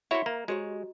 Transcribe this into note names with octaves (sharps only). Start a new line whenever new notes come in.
E4 F#4 C5 C#5 E5
A#3 A#5
G#3 F#4 G4 C5 C#5 D#5